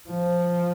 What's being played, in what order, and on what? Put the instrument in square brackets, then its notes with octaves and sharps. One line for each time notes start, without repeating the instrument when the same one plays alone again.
[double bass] F3